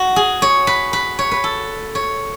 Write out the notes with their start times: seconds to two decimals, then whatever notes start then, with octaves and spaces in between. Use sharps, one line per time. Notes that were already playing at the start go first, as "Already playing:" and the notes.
Already playing: F#4
0.16 G#4
0.42 C#5
0.67 B4
0.93 B4
1.19 C#5
1.31 B4
1.44 A4
1.95 C#5